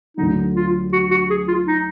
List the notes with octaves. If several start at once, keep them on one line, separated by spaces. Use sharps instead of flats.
D2 D3 F#3 D#4
F4
F#4
F#4
G#4
F4
D#4